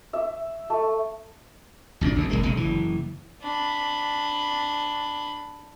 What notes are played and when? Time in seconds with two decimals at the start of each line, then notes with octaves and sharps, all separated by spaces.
0.13 E5
0.70 A3
2.01 G#1 C#2 A2 D4
2.16 G#1 D2 E3 F#3
2.30 D1 C2 G#3 A#3
2.45 A#1 D3
2.57 F#1 E3
3.43 D4 B5